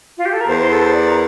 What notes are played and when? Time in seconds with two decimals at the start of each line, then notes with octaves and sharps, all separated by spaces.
0.18 F4
0.25 G4
0.33 A4
0.41 A#4
0.48 E2 C5
0.59 C5
0.71 A4
0.82 C5
0.93 D5
1.08 A#4